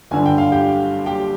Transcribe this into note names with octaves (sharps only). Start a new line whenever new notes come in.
G1 G2 D3 G#5
G5
F5
G4 G5
G4 G5